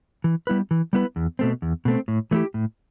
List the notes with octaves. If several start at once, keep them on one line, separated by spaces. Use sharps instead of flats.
E3
G3 B3 E4 B4
E3
G3 B3 E4 B4
E2
B2 A3 C4
E2
B2 A3 C4
A2
E3 A3 E4 G4
A2